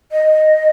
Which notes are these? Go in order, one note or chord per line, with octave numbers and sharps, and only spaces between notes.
D#5